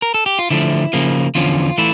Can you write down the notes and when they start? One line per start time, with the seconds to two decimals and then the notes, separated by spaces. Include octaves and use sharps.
0.02 A#4
0.14 A4
0.26 G4
0.39 F4
0.50 D3 F3 A3 E4
0.93 C#3 F3 A#3
1.35 E2 D3 F3 C#4 F4
1.78 E3 A3 E4